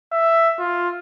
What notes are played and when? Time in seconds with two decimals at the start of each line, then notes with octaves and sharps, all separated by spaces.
0.12 E5
0.59 F4